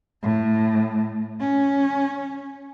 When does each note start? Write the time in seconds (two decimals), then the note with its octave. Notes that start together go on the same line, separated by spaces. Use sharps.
0.23 A2
1.40 C#4